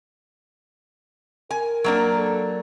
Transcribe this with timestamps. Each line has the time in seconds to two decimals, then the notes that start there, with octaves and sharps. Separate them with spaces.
1.51 A#4 G#5
1.84 F#3 A#3 D4
2.16 A4